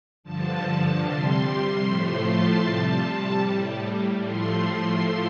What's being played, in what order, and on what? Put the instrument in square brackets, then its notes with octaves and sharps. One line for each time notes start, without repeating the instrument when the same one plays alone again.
[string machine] G2 D3 F3 A5
C3 G3 C6
C6
A2 F3 A3 C6
A5
C3 G3
A2 G3
A2 F3 A3 C6